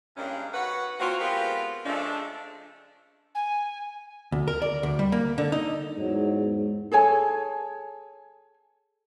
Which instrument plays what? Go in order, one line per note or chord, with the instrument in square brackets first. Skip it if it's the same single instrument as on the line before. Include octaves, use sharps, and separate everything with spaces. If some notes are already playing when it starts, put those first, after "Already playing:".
[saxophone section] E2 G2 G#3 A#3 C#4 D4
D#3 F#4 B4 C#5 F#5
F#3 A#3 C4 F4 F#4
G#3 B3 C4 F4 G4 A#4
C#3 F3 G#3 A3 D4
[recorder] G#5
[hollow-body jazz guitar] D2
A#4
D5
D2
G3
A#3
D3
D#4
[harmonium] E2 F#3 [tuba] G#2
[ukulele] G#4 A4 C#5 G#5